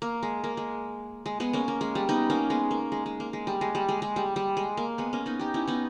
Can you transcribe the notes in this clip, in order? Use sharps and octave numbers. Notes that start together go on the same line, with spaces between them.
A#3
G#3
A#3
G#3
G#3
G#3 B3
A#3 C#4
A#3
G#3
G3
B3 D#4
A#3 C#4
G#3 B3
A#3
G#3
G#3
A#3
G#3
G3
G#3
G3
G#3
G#3
G3
G3
G#3
A#3
G#3 B3
A#3 C#4
B3 D#4
D#4 G4
C#4 E4
B3 D#4